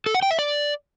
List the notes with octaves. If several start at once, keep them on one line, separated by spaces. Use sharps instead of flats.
A4
F#5
G5
E5
D5